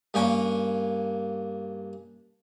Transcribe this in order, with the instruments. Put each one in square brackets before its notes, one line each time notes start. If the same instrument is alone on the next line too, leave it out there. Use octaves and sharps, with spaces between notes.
[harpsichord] G2 A#3 C#4 G5